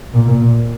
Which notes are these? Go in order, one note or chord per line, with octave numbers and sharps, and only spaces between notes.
A#2